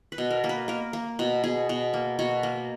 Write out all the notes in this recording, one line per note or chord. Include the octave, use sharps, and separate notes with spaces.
B4
B2
A#4
A#3
B4
A#3 A#4
A#3
B2
B2 G#4
B2
A#3
B2 F#4
A#3